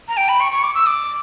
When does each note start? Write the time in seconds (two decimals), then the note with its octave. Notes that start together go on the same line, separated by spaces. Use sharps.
0.08 A#5
0.17 G5
0.29 B5
0.40 C#6
0.52 C#6
0.63 D6
0.75 E6
0.87 D6